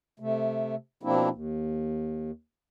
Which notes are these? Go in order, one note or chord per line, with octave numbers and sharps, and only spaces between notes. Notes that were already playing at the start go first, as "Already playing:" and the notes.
C3 A3
B2 F3 A#3 C4 D4 E4
D#2